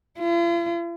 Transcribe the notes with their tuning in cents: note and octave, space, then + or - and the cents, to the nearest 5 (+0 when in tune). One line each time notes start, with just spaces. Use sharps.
F4 -45